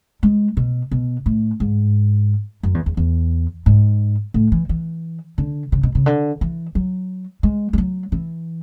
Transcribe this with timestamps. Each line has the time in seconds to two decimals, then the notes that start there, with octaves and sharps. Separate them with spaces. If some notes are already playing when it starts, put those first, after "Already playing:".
0.23 G#3
0.57 B2
0.91 B2
1.26 A2
1.60 G#2
2.63 F#2
2.74 E2
2.86 E2
2.97 E2
3.66 G#2
4.34 A2
4.52 E3
4.69 E3
5.38 D3
5.72 C#3
5.83 B2
5.95 C#3
6.06 D3
6.41 E3
6.75 F#3
7.43 G#3
7.73 G#3
7.78 F#3
8.12 E3